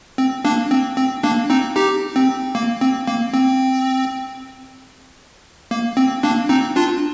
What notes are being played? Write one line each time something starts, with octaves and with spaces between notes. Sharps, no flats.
C4
A#3 D4
C4
C4
A#3 D4
C4 D#4
D#4 G4
C4
A#3
C4
A#3
C4
A#3
C4
A#3 D4
C4 D#4
D4 F4